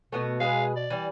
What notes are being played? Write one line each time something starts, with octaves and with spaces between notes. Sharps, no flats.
B2 A3 B3 F#4
G#3 G#4 B4 F5
D5
E3 G3